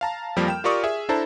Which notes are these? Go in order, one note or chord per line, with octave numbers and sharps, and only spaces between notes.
F5 A5 A#5
F2 F3 G3 A#3 A#4 F6
G5 E7
F4 G4 A#4 D5 C#6 D#6
G#4 E5
D4 E4 A4 C5 A5 A#5